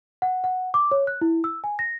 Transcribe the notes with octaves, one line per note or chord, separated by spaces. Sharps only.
F#5
F#5
D6
C#5
F#6
E4
E6
G#5
A#6